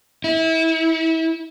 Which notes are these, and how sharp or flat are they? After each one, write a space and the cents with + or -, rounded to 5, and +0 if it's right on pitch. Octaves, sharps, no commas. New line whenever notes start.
E4 -30